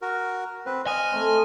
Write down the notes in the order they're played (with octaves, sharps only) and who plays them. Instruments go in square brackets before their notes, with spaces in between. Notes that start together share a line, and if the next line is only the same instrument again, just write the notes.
[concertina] F#4 A#4
[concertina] C4 B4 [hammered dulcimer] C5
[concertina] D#5 F6 [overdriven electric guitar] G#5
[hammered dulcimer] A3 C4 C6